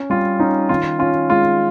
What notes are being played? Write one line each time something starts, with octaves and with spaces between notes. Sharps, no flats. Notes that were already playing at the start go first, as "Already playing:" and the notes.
Already playing: C#4
G3 F4
C#4 D#4
D#3 F4
C#4 F4
G#3 F4